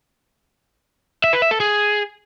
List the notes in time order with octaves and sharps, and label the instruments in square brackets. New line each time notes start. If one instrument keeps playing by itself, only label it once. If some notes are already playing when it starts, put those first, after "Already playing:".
[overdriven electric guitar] E5
B4
E5
A4
G#4